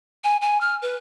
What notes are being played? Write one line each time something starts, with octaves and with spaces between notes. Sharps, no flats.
G#5
G#5
F6
B4